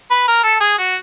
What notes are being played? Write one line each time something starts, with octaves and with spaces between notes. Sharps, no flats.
B4
A#4
A4
G#4
F#4